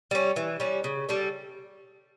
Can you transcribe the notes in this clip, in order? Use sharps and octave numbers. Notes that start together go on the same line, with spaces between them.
G3 C#4
E3
G3 C#4
C#3
G3 D4 A4